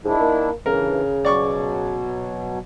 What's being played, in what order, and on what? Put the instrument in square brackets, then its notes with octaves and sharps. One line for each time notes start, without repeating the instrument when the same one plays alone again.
[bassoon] G#2 [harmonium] D#3 D4 E4
[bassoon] A#3
[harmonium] G2 E3 [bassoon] C#3 [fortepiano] A#4
[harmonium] B2 F#3 [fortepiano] D5 C#6 D6